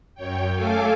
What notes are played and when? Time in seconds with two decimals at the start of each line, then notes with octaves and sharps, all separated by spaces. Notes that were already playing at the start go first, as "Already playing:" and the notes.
0.15 F#2 C#5 G5
0.54 A3 A4 F5 G#5 D6